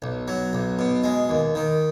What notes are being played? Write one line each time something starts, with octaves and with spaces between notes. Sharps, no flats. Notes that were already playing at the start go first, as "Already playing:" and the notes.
B1
F#3
B1
B2
G#3
D#2
D#3